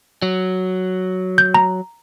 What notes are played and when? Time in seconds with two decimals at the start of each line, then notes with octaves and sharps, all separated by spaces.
0.22 F#3
1.38 G6
1.54 A#5